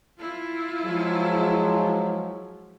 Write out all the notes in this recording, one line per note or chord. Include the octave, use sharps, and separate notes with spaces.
E4 F4
F3 F#3 G#3